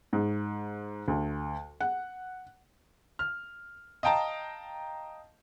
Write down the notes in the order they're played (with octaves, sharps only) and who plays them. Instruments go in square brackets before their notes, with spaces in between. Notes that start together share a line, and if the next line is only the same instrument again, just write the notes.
[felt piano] G#2
D2
F#5
[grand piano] F6
D#5 F5 G5 A5 A#5